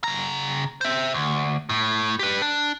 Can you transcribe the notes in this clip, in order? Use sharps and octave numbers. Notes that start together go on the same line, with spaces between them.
C#3 A#5
C5 E5
D2
A2
G4 B4
D4